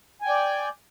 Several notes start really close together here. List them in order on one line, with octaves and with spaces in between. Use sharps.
G#5 G5 D5